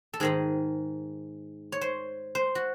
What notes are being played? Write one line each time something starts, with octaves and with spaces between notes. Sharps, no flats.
A4
G#2 D#3 G#3 G#4
C#5
C5
C5
F#4